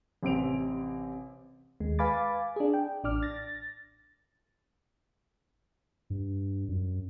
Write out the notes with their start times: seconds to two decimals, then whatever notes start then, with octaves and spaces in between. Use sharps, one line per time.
0.23 A1 C3 C4 D7 F7
1.80 D#2 G#3
1.99 B4 F5 G#5 B5 D6 A6
2.56 D4 G#4
2.74 G5
3.04 A1 D4 D6 F6
3.23 A6 A#6
6.10 G2
6.68 F#2